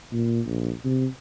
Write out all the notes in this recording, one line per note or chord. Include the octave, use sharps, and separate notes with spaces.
A#2
A#1
C3